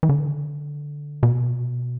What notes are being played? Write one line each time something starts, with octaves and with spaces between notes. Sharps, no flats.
E3
D3
B2